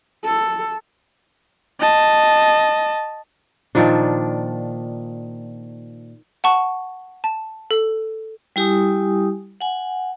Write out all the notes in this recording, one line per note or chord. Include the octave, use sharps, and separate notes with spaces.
A4
D#5 A5
A#2 D#3 F3 D4
F#5 A5 C#6
A5
A4
G3 E4 G4 G#5 D#6
F#5 G#5